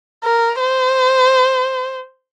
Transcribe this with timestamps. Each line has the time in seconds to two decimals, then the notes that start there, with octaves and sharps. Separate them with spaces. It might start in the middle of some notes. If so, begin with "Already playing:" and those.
0.24 A#4
0.60 C5